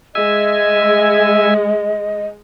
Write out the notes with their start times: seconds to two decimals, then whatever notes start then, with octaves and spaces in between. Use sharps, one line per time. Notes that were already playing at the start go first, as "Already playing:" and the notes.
0.15 G#3 D#5 E5 G#5